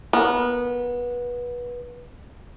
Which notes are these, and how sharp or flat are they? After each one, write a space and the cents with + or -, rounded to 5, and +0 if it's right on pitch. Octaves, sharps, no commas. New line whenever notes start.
B3 -20 A#4 +0